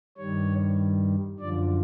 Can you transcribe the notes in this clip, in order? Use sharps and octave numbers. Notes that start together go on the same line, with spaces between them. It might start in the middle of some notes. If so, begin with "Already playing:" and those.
G2 D#3 G3 C#5
F#2 D3 F3 D5